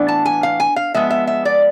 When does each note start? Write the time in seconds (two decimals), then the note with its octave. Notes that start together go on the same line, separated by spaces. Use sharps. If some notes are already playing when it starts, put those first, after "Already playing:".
Already playing: A2 E3 B3 D4
0.08 A5
0.25 G#5
0.43 F5
0.60 G#5
0.76 F5
0.94 F3 G#3 B3 E5
1.11 E5
1.27 E5
1.45 D5